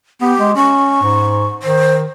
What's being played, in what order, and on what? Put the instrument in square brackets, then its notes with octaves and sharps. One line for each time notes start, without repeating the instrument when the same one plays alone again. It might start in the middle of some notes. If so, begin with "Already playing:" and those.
[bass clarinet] B3 [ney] G4
[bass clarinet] G#3
[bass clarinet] C#4 [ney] C#6
[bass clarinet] G#2
[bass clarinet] D#3 [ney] C5